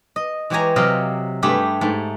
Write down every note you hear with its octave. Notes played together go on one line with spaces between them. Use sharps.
D#5
E3 G#3 G4 C#5 G#5 A#5
C3 F#3 D#5 F5 G5
G2 A3 G4 G#4 B5
G#2 A3